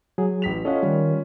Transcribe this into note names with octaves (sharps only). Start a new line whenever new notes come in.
F#3 G#4
A1 B6 F7
C#4 F4 A4 D#5 F#5
D#3 G3